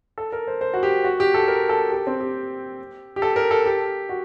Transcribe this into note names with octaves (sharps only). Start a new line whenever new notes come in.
A4
A#4
C5
C5
F#4
G4
F#4
G4
A4
A#4
A4
G4
C4
G4
G4
A4
A#4
A4
G4
F#4